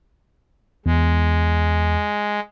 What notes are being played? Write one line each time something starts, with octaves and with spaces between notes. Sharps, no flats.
E2 G#3